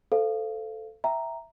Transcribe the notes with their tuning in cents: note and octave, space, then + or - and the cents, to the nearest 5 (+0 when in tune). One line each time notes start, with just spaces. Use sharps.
A4 +0 C5 -25 F5 -15
E5 +0 G5 +0 A#5 +0